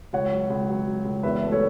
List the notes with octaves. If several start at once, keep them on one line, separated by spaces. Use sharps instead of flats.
C#2 C#5 F#5
F#3
C#2
F#3
F#3
C#2
E2 B4 E5
A3
A4 C#5